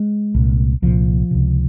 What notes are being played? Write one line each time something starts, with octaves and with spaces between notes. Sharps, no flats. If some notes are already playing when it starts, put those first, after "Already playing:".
Already playing: G#3
C2 A#2
C2 A#2 F3
C#2 C3